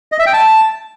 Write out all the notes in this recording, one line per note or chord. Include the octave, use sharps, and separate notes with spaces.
D#5
E5
G5
A5